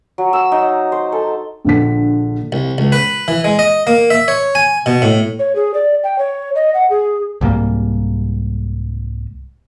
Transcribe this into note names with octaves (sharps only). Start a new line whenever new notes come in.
F#3
E6
D#4
C5
A4
A#1 D3 B6
C2
C#2
B4
E3
G#3
D#5
A#3
E5
C#5
G#5
B2
A2
C#5
G#4
D5
G5
C#5
D#5
F#5
G#4
C2 G#2 G3 A#3